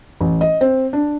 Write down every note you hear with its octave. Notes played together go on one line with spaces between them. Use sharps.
A1
D#5
C4
D4